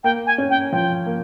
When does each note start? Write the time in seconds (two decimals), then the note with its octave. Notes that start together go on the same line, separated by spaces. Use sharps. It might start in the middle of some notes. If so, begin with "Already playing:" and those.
0.04 A#3 G5
0.26 G#5
0.38 C#4
0.50 G5
0.72 F3 G5
1.06 A#3